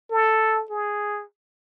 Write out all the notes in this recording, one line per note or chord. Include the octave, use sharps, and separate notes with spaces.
A4
G#4